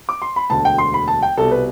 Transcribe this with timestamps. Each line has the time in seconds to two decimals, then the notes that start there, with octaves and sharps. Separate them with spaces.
0.09 D6
0.22 C6
0.36 B5
0.50 E1 D2 D3 A5
0.65 G5
0.78 C6
0.94 B5
1.08 A5
1.22 G5
1.37 C2 B2 A4
1.51 B4